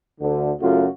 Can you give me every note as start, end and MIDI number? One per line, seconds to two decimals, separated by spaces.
0.20 0.50 38
0.20 0.50 50
0.61 0.87 42
0.61 0.87 49
0.61 0.87 57
0.61 0.87 65
0.61 0.87 66